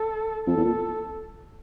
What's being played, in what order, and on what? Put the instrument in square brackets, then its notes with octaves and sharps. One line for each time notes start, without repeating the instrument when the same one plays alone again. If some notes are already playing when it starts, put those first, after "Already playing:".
Already playing: [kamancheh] A4
[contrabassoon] F2 [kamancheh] A4
[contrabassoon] E2
A#2